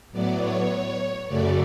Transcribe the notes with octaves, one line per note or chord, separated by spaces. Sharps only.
A2 F#3 B3 D5
C#5
F#2 C#3 F#3 A3 D5